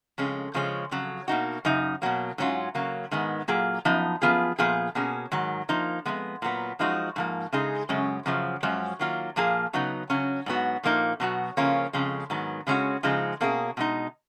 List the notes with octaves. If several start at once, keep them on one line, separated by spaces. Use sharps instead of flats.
F2 C#3 G#3 C#4
C#3 F3 G#3 C#4
F2 C#3 F#3
B2 A#3 D#4 F#4
F#2 C#3 D#4
B2 F#3 A#3
G#2 F#3 C#4 F4
C#3 F#3 A#3
G#2 D#3 G#3 B3
A#2 F#3 A#3 F4 G#4
F#2 F3 B3 D#4
F#2 F3 B3 F4 G#4
A#2 F3 B3 F4 G#4
B2 A#3 C#4 G#4
G#2 D#3 F#3
F3 A#3 D#4
F2 C#3 G#3 B3
A#2 F#3 B3
F#2 F3 G#3 D#4 F#4
G#2 F3 A#3
C#3 G#3 D#4 G#4
F#2 C#3 G#3 C#4
F#2 C#3 F3
F#2 F3 G#3 C#4
D#3 F#3 A#3 F4
A#2 F3 A#3 F4 G#4
C#3 F#3 B3 D#4
C#3 F#3 C#4
G#2 F#3 B3 F#4
A#2 F3 A#3 D#4
B2 F#3 B3 F#4
C#3 F3 A#3 C#4 F4
F2 C#3 G#3
G#2 D#3 F#3 B3
C#3 G#3 C#4 F#4
C#3 F3 G#3 D#4
B2 A#3 C#4 G#4
B2 G#3 D#4